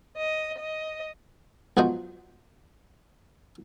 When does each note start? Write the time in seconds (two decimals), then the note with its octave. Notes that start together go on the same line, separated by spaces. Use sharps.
0.17 D#5
0.60 D#5
1.77 B1 F3 F#3 F#4 C5 D#5